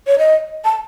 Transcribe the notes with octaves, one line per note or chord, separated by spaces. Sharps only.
C#5
D#5
A5